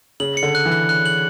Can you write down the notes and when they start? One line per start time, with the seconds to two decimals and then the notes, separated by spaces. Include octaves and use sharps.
0.20 C#3 F#7
0.37 C#7
0.43 D3
0.55 F#6
0.65 E3
0.72 F#6
0.89 F#6
1.06 F#7